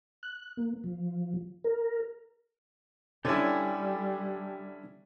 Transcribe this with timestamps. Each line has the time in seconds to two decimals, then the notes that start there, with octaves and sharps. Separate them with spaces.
0.23 F#6
0.57 A#3
0.84 F3
1.64 A#4
3.25 D3 G3 C#4 D4 E4 G4 A4 G#5